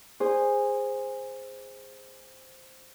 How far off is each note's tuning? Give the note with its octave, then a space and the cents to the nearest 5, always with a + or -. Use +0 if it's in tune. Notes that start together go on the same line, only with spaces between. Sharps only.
G#4 -15 C5 +0